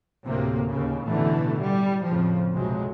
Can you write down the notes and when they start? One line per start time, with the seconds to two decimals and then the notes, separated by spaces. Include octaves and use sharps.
0.26 D2 A2 C3 A#3
0.68 D#2 C#3
1.06 A1 B2 D3 E3 A3
1.62 G3
2.07 F2 A2 C#3 F3
2.55 B1 F2 C3 F#3 G#3